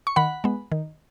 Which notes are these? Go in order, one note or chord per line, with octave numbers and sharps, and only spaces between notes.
C#6
D#3 F#5 B5
G#3 B3
D#3